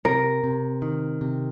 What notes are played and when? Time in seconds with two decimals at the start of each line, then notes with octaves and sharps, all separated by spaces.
0.05 C3 A#4
0.44 C3
0.82 D#3
1.21 C3